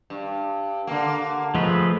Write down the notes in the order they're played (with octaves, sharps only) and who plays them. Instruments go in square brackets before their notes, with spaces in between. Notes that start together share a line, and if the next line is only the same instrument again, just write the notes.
[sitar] G2
D3 A#3
[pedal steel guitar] F3 A3 B4 [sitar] G#3